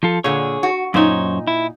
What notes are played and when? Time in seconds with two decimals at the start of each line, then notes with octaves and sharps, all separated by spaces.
0.03 F3 F4 A4
0.24 A#2 D3 G#4 C#5
0.63 F#4
0.94 F#2 A#2 D#4 C5 C#5
1.47 E4